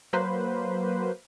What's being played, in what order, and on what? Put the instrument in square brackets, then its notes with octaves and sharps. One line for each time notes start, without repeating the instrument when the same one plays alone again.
[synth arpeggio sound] F#3 A#3 B4 C5